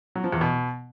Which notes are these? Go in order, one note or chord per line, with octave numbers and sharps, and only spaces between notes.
F#3
F3
E2
B2